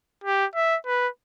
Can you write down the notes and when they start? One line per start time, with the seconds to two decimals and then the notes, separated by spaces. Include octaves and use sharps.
0.24 G4
0.55 E5
0.86 B4